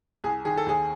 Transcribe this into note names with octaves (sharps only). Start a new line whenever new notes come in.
C2 G#4
D#3 G#4
A4
D#2 G#4